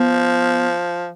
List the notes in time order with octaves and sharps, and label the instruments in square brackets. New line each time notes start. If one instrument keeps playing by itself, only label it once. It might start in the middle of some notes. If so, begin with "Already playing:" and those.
Already playing: [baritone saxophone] F3 [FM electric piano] B3